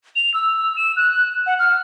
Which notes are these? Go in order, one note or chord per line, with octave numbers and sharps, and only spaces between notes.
F7
E6
E7
F#6
F#5
F6